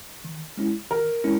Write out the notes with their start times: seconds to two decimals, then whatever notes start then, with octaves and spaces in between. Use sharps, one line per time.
0.25 D#3
0.57 G#3 C#4 E4
0.91 D#3 A#4
1.24 G#3 C#4 E4